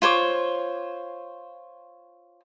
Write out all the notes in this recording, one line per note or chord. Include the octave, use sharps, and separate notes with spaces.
F4 C5 C#5 D6